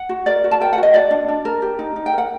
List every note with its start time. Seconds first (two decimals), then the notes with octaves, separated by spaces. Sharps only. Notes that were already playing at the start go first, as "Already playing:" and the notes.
Already playing: F#5
0.09 F#4
0.26 A#4 D5
0.44 F#4
0.51 A5
0.61 A#4 G5
0.73 F#5
0.78 F#4
0.83 D#5
0.94 F#4 D5
1.11 D4
1.28 D4
1.45 A#4
1.62 G4
1.79 D#4
1.96 D#4
2.06 G5
2.13 A#4 F#5